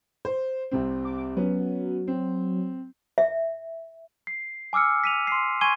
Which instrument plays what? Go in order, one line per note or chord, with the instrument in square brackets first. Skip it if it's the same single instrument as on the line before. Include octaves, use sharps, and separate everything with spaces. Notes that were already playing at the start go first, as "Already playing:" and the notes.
[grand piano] C5
C2 C3 C4
[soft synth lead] D6
[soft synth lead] F#3 [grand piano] B3 C#4
[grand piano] C4
[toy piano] E5
[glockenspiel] C7
G#5 D6 E6 F6 C#7
B6 D#7 F7
C6 C7
G#5 C6 C#6 G#6 D#7 G7